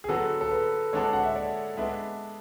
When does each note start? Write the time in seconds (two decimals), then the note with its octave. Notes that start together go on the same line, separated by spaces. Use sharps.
0.04 G#4
0.08 D3 F#3 B3 F#4 A4
0.41 A4
0.51 B4
0.93 D3 G#3 D4 F#4 A4 C#5
1.13 F#5
1.23 E5
1.36 D5
1.77 G#3 B3 D4 E5